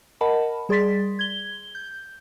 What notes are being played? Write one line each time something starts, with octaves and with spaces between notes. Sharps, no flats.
A#4 D#5 F#5 A5 B5
G3 G#4 D5 C6 A6 B6
G#6 G7
G6